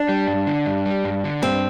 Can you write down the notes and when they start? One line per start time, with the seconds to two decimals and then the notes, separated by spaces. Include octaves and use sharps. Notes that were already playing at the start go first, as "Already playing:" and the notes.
Already playing: D4
0.09 G3
0.27 G2
0.47 D3
0.66 G2
0.86 G3
1.04 G2
1.24 D3
1.42 G2 C4